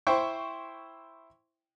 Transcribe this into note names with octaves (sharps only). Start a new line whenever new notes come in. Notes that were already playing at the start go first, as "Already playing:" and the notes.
E4 C5 G5 C#6